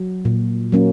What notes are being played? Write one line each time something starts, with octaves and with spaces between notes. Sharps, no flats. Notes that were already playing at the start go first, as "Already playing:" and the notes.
Already playing: F#3
A#2
F#3 A#3 C#4